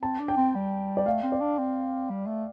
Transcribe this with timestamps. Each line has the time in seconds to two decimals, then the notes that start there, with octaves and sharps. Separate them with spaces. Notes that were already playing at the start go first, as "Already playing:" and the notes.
0.02 C4 A5
0.19 D4
0.28 G5
0.37 C4
0.55 G3
0.97 D5
1.06 A3 F5
1.23 C4
1.32 D5
1.40 D4
1.58 C4
2.10 G3
2.27 A3